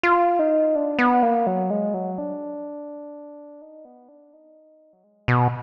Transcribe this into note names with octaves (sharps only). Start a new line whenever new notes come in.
F4
D#4
D4
B3
A#3
F#3
G#3
F#3
D4
D#4
B3
D4
D#4
F#3
G#3
B2